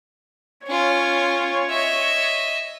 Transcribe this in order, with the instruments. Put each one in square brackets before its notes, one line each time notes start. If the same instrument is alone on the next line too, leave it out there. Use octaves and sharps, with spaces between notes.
[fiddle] C#4 F4 [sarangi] C#5
[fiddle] D#5 E5